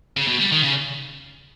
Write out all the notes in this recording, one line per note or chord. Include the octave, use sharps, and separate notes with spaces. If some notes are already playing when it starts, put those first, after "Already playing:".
C#3
B2
G3
D#3
C#3